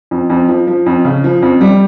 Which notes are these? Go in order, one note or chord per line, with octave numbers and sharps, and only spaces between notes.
F2
F2
F3
F3
F2
C#3
F3
F2
G3